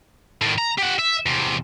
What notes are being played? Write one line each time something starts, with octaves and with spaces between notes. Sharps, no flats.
A2 D#3
A#5
G4 F#5
E5
E2 C3